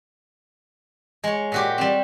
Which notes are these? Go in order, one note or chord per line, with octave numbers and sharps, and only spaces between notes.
G#3 C#5
A#2 F#4 G4
G3 C4